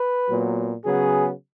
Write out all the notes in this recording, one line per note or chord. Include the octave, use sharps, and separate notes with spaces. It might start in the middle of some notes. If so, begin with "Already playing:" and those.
Already playing: B4
A#2 F#3 B3
C#3 F#3 B3 G#4